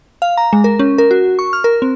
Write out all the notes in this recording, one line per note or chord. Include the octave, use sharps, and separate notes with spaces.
F5
A#5
G#3
A#4
C#4
A#4
F#4
C#6
F6
A#4
C4